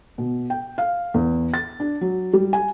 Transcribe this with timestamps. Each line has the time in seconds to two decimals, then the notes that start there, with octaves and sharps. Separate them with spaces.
0.18 B2
0.50 G5
0.78 F5
1.14 E2
1.54 A6
1.80 D4
2.01 F#3
2.33 G3
2.53 G#5